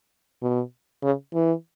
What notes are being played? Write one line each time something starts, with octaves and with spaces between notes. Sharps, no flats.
B2
C#3
E3